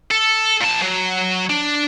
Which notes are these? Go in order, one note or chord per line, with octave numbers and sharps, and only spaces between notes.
A4
A#2 A5
F#3
D4